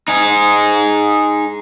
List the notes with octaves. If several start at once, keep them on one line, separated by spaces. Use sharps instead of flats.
D#4 G#4